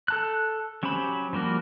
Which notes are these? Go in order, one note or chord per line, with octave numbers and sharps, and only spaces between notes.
A4 A5 F#6
F#3 C#4 G4 C5 B5
F3 G3 A#3 F#4